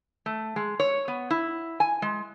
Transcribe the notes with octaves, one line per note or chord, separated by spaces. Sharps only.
A3
G#3
C#5
B3
E4
G#5
G#3